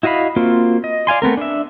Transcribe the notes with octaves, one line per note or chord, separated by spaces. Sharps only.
E4 F#4 D#5 F5 B5
A#3 C4 F4 F#4
D#5
D5 F5 G#5 C6
A3 B3 C4 A#4
D4 E5